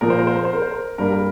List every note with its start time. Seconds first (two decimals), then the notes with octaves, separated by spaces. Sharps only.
0.01 A#2 F3 A#3 A#4
0.10 C5
0.19 A#4
0.27 C5
0.36 A#4
0.45 C5
0.53 A#4
0.62 C5
0.71 A#4
0.98 G2 G3 A#3 A#4
1.12 A#4